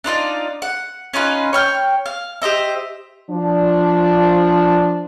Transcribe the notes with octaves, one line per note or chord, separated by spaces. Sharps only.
D4 D#4 F4 D5
F#5
C#4 D#4 F4 B4
C#5 G5 F6
F5
G4 C5 D#5 E5
F3 D4